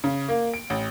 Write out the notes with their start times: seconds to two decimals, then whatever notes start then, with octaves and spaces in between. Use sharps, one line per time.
0.04 C#3
0.29 A#3
0.54 D7
0.70 A1